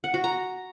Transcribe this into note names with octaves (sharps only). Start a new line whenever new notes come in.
F#5
F#4
A#5